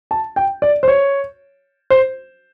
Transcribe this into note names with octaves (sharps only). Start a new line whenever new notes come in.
A5
G5
D5
C5
C#5
C5